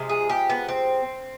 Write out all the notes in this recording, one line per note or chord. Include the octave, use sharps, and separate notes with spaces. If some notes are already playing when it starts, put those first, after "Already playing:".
Already playing: C3 F3 G#3
G#4
G4
B3
C4